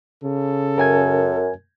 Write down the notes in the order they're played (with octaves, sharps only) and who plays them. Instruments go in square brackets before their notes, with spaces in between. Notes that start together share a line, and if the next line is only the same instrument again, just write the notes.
[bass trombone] C#3 [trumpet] A4
[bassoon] F#2 [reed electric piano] A#4 G#5 G#6